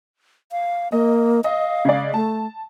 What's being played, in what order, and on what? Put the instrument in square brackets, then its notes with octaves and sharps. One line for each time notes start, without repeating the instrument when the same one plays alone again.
[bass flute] F5
[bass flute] A#3 [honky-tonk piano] D#5
[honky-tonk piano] D#5 [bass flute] F5
[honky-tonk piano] C#3 G#3 D5
[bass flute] A3 [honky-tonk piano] A5